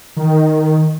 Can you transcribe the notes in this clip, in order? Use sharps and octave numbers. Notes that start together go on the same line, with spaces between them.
D#3